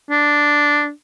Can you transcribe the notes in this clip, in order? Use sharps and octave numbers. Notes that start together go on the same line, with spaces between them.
D4